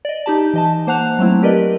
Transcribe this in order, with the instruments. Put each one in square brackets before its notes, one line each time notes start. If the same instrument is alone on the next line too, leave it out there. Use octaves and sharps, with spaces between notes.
[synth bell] D5 D#5
D#4 G4 A5
E3 D#5 A5
A#3 C5 F#5 A5 F#6 F7
F#3 A3 C4 E4
G4 A#4 B4 D5 D#5